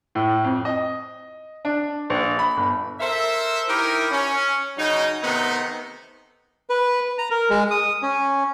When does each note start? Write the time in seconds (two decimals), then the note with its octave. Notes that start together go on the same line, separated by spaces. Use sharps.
0.15 A2
0.44 F2
0.65 D#5
1.65 D4
2.10 A#1
2.39 B5
2.57 G1
3.00 A4 A#4 C5 E5
3.68 D#4 E4 G4 A#4
4.11 C#4
4.77 C#3 F#3 D#4
5.23 C3 D#3 A3 B3 D#4
6.70 B4
7.18 A#5
7.31 A#4
7.50 G#3
7.71 D#6
8.02 C#4